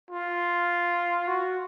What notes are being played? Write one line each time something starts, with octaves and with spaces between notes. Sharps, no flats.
F4
F#4